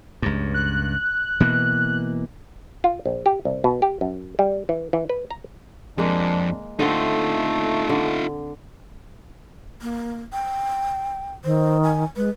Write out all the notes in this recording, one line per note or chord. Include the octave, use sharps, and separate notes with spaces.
C#2 G2
F#6
B2 E3 A#3
F4
A#1
G4
C2
B2
G4
F#2
G3
E3
E3
B4
A#5
F2 G#3 A#3 D4
D3 A3 C4 D#4 F4
D3
A#3
G5
D#3 C5
G#5
G#3 B4